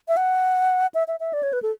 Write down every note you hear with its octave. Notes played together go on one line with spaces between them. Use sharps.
E5
F#5
E5
E5
E5
D5
C#5
B4
A4